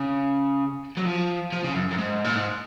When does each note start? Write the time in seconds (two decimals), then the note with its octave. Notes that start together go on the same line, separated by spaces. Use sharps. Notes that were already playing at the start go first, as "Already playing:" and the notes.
Already playing: C#3
0.97 F#3
1.05 F3
1.52 F3
1.64 C#3
1.75 F#2
1.91 F#2
1.98 G#2
2.24 A#2
2.35 G#2